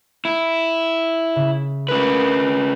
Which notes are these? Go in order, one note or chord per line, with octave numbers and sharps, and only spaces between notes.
E4
C#3 E5
C#3 A#4 B4